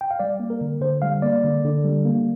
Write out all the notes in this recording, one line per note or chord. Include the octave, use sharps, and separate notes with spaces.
G5
F5
G3 D5
A#3
A#4
D3
D3 C5
G3 F5
A#3 D5
D3
D3
G3
A#3